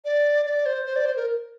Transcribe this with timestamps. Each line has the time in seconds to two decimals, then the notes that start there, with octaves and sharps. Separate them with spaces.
0.05 D5
0.45 D5
0.66 C5
0.86 C5
0.96 D5
1.06 C5
1.16 A#4